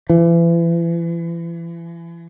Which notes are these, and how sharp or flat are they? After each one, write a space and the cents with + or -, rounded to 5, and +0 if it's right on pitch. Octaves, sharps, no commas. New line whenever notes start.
E3 +35